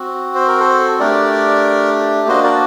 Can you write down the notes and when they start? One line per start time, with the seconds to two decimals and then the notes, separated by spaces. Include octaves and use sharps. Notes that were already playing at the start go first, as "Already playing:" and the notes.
Already playing: C4 F#4
0.35 C5
0.48 A#4
0.60 A4 C5
1.00 A3 D4 G4 A#4 D5
2.28 A#3 D4 F#4 C5 D#5
2.44 A#4 D5